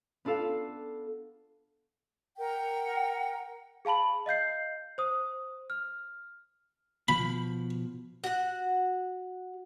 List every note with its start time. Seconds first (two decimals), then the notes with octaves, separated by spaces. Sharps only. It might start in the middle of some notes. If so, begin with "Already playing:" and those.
0.25 B3 D4 F4 A4 F5
2.37 A#4 F#5 G5
3.85 G#4 F5 A5 B5 F#7
4.26 D#5 F5 G6 C7
4.98 C5 D#6
5.70 F6
7.08 B2 F3 B5
8.24 F#4 F#5